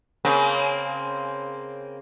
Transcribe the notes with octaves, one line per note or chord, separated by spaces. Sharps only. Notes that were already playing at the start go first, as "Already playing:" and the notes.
C#3 A#3 C4